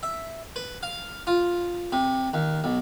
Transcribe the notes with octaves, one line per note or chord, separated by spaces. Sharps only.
E5
B4
F5
F4
C3
D#2
B1